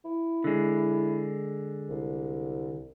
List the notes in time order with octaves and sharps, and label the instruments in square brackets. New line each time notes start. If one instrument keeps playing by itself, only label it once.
[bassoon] E4
[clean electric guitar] D3 G#3
[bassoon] C2